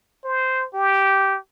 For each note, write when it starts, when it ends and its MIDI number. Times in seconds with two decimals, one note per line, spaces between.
0.24 0.67 72
0.74 1.38 67